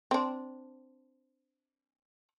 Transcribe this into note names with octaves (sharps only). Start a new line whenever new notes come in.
C4 D4